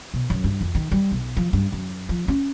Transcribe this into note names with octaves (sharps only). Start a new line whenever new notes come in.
B2
F#2
G2
F2
D#3
G3
B1
F3
G2
F#2
F3
C#4